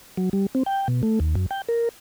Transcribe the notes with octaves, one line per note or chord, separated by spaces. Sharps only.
F#3
G3
C4
G5
B2
A3
D#2
F#2
G5
A#4